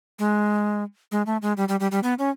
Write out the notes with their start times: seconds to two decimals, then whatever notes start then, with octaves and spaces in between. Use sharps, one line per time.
0.19 G#3
1.12 G#3
1.26 A3
1.42 G#3
1.57 G3
1.69 G3
1.80 G3
1.91 G3
2.03 B3
2.19 C#4